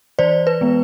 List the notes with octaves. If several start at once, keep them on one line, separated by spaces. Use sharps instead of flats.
E3 C5 D5
B4
G#3 B3